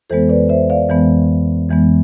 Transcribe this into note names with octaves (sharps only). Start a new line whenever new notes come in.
F2 E3 G#3 B3 A4 C5
B4 D5
C5 E5
D5 F5
F2 E3 G#3 B3
F2 E3 G#3 B3